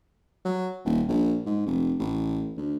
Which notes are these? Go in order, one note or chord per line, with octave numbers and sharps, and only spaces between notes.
F#3
D#1
A#1
G#2
F1
A1
D2